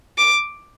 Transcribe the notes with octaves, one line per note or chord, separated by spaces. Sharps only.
D6